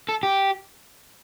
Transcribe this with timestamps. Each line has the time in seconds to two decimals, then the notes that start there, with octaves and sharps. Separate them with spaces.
0.09 A4
0.23 G4